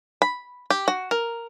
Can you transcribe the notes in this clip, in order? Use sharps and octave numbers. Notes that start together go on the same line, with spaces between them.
B5
G4
F#4
A#4